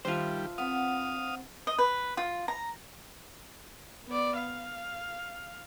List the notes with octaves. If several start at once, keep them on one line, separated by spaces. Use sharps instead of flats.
D#3 G3 D4 F4 C5 E5
B3 C4 F5 D#6
D#5
B4
F4
A#5
B3 D5
F5